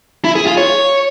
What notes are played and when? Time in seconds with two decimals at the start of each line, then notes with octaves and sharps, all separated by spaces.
0.24 E4
0.35 G#4
0.46 F4
0.57 C#5